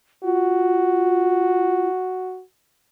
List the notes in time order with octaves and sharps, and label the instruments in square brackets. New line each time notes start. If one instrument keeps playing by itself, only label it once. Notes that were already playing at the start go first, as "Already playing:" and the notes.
[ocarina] F4 [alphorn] F#4